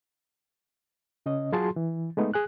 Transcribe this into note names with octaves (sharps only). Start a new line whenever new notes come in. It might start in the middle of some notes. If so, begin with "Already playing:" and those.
C#3 C#4 D#5
F#3 F4 F#4 G#4 A5 C6
E3
G#3 A3 B3 D#4
G#4 G#5 F#6